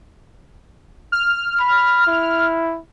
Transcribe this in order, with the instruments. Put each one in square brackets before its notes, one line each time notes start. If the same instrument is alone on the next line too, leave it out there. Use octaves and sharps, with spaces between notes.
[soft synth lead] F6
[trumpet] B5
E4